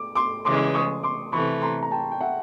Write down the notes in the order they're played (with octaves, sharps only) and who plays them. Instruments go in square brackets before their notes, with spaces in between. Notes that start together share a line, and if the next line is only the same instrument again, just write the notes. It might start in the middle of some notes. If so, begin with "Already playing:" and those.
Already playing: [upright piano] D6
C6 D6
[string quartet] C#3 E3 G#3 [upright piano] C6 D6
[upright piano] C#6 D#6
C6 D6
[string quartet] C3 E3 A3 [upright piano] B5 C#6
[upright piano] A#5 C6
A#5
G5 A5
G5
E5 F#5